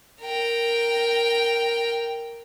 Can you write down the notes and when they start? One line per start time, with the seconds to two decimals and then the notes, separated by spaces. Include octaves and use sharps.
0.21 A#4 G5